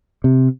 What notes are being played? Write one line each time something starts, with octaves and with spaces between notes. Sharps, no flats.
C3